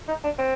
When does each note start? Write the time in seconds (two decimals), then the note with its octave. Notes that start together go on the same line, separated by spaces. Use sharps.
0.08 D#4
0.24 D4
0.39 C4